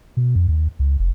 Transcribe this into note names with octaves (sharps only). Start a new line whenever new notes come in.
B2
F2
D#2
C#2
F1